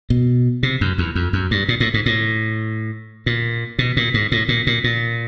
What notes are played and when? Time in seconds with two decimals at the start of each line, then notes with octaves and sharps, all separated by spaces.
0.10 B2
0.63 C3
0.81 F#2
0.98 E2
1.15 F2
1.33 F#2
1.51 G2
1.68 A#2
1.80 A2
1.94 G#2
2.06 A2
3.26 A#2
3.79 B2
3.97 A#2
4.14 G#2
4.32 A2
4.49 A#2
4.67 A#2
4.84 A#2